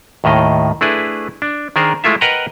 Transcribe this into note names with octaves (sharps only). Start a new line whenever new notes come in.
D#2 A2 D#3 D#5
A3 D4 E4 G#4 B4
D4
D#3 D4 G#4 A#4 C5
G#3 A3 E4 F4 E5
A#4 B4 D#5 F#5 G5 A#5